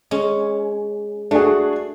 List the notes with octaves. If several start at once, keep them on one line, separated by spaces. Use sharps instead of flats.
G#3 C#4
A3 D4 F#4 G#4